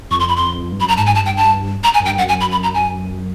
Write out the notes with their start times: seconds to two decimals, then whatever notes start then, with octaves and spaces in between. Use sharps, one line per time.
0.10 F2 C#6
0.20 C6
0.29 B5
0.37 C6
0.72 G2
0.80 F#2 B5
0.88 A#5
0.97 G#2 A5
1.06 G#5
1.14 G2 A5
1.26 G5
1.37 A5
1.84 A#5
1.94 G#5
2.00 F#2
2.05 G5
2.09 G2
2.17 F#2 F#5
2.29 G#5
2.41 B5
2.51 B5
2.63 A#5
2.74 G#5